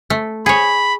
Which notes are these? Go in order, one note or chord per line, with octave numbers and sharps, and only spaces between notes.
A3
G#4 C#5 B5